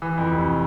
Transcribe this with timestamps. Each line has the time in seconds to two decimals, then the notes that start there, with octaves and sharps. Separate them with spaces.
0.02 E3
0.18 F2
0.32 F1